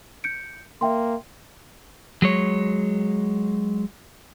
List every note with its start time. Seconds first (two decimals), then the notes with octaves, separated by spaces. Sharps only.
0.24 G6 C#7 D7
0.81 A#3 E5 G5 C6
2.22 F#3 G#3 C#5